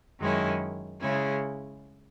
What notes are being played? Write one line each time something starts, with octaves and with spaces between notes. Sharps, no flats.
F#2 D#3 G#3 C#4 E4
C#3 G#3 C#4 E4